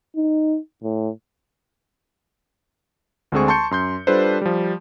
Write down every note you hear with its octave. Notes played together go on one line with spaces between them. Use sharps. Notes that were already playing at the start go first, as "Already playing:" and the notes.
D#4
A2
D2 D3 G#3 C4 G#4 C#6
A5 C6 C#6 G6 C#7
F#2 C6 G6
G3 D4 F4 A4 B4 C5
F3 G3